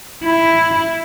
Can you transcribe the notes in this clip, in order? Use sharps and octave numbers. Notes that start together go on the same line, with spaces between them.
E4